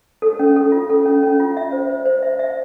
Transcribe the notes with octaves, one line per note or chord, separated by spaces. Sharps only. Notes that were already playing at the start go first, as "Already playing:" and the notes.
A4
C#4
A4
F4
A4
C#4
C#4
F4
E5
C5
C5
C5
E5
E5